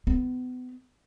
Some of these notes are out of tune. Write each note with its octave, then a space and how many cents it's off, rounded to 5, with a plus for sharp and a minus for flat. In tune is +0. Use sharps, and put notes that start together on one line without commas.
B3 +30